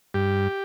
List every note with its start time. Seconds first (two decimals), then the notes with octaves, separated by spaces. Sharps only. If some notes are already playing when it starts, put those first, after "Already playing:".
0.14 G2 G4